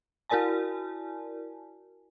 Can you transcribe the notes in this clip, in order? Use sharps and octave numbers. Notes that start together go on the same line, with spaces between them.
E4 F#4 A#4 D5 G#5 A5